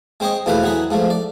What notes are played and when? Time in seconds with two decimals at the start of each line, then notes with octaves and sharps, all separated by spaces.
0.20 G#3 C4 C5 C#5 D#5
0.46 E2 B2 A3 F4 B4 C5
0.63 E3 F#3 B3 G#4 B4
0.91 G#2 F3 A3
1.10 D5